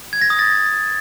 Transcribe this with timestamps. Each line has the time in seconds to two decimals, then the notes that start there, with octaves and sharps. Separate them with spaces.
0.13 G#6
0.22 A#6
0.30 D#6
0.39 A6